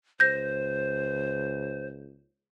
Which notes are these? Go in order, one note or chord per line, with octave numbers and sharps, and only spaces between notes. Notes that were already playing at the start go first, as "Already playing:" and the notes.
C#2 C5 G6 A#6